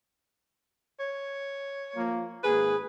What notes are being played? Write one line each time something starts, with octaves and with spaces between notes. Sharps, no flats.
C#5
F3 A#3
G#1 A#3 G#4 B4